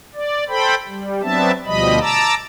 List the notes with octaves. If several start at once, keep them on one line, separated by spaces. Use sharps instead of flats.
D5
A4 C5 G5 B5
G3
F#3 B3 C4 D4 E5 A5
D2 B2 F3 G3 D#5 B5
A5 A#5 D6 E6